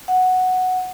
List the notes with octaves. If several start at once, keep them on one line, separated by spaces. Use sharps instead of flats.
F#5